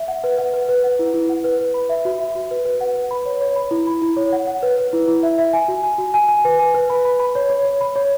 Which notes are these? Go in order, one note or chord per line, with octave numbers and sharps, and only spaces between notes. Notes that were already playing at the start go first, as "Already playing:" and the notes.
Already playing: E5
F#5
B4
F#5
B4
B4
F#5
E4
E4
F#5
B4
B4
B5
E5
F#4
E5
F#4
B4
B4
F#5
B4
B5
C#5
C#5
B5
E4
B5
E4
C#5
F#5
F#5
B4
B4
E4
E4
E5
E5
G#5
F#4
G#5
F#4
G#5
G#5
B4
G#5
B4
B5
B5
B5
C#5
C#5
C#5
B5
C#5